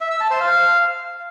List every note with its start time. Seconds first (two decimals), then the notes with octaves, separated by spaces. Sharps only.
0.01 E5
0.11 E6
0.21 A5
0.31 C5
0.40 F5